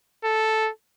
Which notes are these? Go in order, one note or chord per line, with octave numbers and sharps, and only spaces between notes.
A4